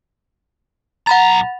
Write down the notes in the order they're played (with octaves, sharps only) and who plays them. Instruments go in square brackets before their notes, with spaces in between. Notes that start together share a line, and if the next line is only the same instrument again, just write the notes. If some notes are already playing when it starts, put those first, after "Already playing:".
[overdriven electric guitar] B1 A#5 [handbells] F#5 B5 A6